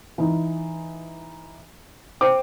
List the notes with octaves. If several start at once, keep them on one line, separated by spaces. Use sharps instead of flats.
E3 D#4
C5 G5 D6